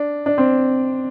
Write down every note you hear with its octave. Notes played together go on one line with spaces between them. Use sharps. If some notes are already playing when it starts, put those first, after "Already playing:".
Already playing: D4
D4
C4